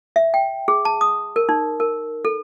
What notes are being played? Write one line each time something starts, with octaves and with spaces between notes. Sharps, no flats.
E5
G5
G#4
A5
D#6
A#4
D#4
A#4
A4